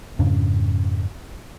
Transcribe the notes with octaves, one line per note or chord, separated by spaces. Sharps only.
F2 G#2 C#3 D4